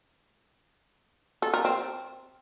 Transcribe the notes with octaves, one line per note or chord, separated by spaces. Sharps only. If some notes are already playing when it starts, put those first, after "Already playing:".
A4
A#4
C4